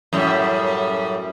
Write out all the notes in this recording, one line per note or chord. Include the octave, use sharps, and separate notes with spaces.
F#2 A2 G3